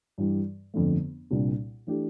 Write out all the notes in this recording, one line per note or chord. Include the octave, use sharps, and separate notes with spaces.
G2 E3 G3
G1 F2 D3 A3
C2 A#2 G3 D4
E3 A3 D4 G4